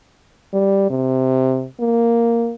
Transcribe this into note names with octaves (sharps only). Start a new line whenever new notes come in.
G3
C3
A#3